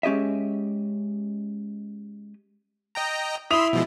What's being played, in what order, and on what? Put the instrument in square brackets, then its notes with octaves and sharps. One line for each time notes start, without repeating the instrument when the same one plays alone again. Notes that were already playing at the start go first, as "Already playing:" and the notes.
[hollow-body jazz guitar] G#3 C#4 G4 D#5 E5
[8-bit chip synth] D#5 G5 A#5
[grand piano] E4 D#6 F7 [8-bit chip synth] B5 C6 E6
[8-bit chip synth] B2 F3 G#3